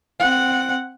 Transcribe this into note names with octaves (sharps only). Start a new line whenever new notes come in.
C4 F#5